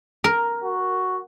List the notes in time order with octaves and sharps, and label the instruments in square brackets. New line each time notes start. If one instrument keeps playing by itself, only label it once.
[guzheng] A#4
[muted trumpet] F#4